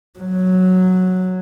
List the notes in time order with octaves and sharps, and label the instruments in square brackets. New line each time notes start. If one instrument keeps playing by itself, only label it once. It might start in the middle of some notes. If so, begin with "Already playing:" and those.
[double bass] F#3